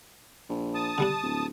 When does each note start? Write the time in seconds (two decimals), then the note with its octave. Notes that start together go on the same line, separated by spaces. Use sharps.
0.49 A#1
0.75 A5 D#6
0.98 D3 G3 D4
1.23 D1